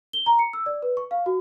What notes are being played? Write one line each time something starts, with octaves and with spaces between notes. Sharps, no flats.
G7
A#5
C#7
E6
D5
B4
C#6
F5
F#4